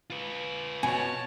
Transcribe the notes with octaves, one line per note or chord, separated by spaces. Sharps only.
F4 B4
B2 C#5 G#5 A5